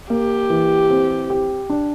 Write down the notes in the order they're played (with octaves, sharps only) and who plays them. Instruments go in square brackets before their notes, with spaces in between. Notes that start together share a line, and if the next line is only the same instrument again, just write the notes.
[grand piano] A#3 [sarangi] G4
[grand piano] E3
C4
G4
D4